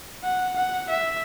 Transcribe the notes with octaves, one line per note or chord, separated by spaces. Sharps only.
F#5
F#5
E5